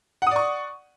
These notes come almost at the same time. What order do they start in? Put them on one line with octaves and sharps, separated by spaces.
F#5 D#6 D5 C#6